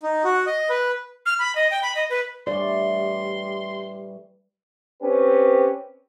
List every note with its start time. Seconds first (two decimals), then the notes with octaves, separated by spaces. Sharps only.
0.03 D#4
0.24 F#4
0.46 D#5
0.70 B4
1.26 F6
1.39 B5
1.55 D#5
1.71 G5
1.83 B5
1.95 D#5
2.10 B4
2.47 A2 E3 G3 D5 C6
5.02 C4 C#4 G4 B4